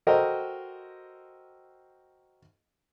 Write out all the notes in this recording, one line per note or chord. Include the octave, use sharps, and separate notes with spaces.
F#4 A4 A#4 C5 D#5 G5